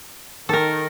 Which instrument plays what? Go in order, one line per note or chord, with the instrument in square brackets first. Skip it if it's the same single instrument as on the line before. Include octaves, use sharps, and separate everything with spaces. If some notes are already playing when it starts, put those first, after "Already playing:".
[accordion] D#3 [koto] A4 A#4